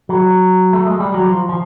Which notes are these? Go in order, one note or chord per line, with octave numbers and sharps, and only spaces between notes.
F#3
A3
G#3
G3
F#3
F3
F3